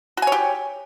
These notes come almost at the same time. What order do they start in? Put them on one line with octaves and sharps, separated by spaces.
F#4 G#5 C#5 G4